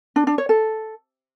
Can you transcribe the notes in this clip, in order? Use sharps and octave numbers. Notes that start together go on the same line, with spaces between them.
D4
D4
C#5
A4